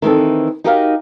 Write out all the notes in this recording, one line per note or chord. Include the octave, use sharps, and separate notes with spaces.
D#3 E3 C4 A4
D#4 F#4 G4 A#4 E5 F5